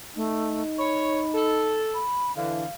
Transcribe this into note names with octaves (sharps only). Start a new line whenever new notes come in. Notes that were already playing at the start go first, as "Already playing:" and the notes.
A3 D#4
C#5 B5
A4
B5
D3 E3 F5